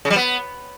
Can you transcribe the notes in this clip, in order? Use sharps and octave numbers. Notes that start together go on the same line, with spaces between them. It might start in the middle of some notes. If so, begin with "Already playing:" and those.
C#3
G3
B3